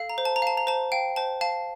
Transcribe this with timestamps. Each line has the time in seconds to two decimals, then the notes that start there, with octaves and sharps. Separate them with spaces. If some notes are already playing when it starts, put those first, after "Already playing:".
Already playing: A4 F5
0.10 A#5
0.18 C5
0.25 A5
0.36 A#5
0.42 F5 A5
0.57 A#5
0.67 C5 A5
0.92 F5 G5
1.16 C5 A5
1.41 F5 A5